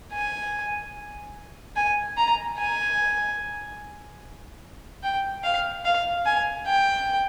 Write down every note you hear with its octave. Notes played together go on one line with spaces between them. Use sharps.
G#5
G#5
A#5
G#5
G5
F5
F5
G#5
G5